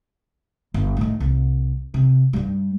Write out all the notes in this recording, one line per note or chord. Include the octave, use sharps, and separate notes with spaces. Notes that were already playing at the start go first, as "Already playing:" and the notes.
G1
A2 D#3
C2
C3
G2 G3